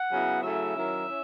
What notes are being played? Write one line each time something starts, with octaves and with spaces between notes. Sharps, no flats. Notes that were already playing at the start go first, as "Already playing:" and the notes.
Already playing: F#5
C#3 F#3 B3 E4
C#3 F#3 A3 E4 E5
D#3 F#3 C#4 E4
C#4 E4